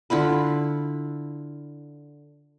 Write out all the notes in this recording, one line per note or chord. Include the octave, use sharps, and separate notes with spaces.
D3 E4 F4 B4